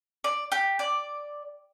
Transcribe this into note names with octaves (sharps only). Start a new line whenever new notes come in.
D5
G4
D5